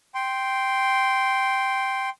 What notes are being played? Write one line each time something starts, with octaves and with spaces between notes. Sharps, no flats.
G5 C6